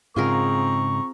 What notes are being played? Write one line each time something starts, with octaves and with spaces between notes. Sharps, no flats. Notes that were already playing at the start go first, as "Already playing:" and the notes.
G#2 C#3 C4 F4 G#4 A#4 A#5 C#6